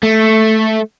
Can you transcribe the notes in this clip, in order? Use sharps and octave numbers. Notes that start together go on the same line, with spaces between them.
A3